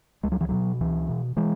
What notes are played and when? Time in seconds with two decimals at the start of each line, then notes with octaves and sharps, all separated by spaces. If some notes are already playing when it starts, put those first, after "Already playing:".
0.23 C#2 G#3
0.32 F#3
0.41 E3
0.49 B2 F#3
0.80 C#2 E3
1.09 B2
1.37 E3 G#3